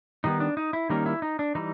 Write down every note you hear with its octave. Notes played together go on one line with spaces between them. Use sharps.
D#3 G3 B3 D#4
D4
D#4
E4
D#3 G3 A#3 C#4 D#4
E4
D#4
D4
E3 G3 D#4